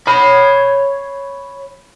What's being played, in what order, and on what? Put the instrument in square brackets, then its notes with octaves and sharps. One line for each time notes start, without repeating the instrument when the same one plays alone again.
[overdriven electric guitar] C#5 B5